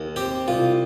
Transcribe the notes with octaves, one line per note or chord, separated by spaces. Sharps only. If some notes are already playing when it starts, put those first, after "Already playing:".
Already playing: D#2
C4 G4
C2 F4